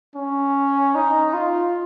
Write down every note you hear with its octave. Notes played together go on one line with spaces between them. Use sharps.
C#4
D#4
F4